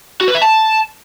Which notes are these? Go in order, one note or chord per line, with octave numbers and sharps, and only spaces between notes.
F#4
B4
E5
A5